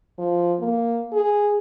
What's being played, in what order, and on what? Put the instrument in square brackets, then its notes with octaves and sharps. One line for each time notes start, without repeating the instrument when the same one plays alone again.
[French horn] F3
A#3
G#4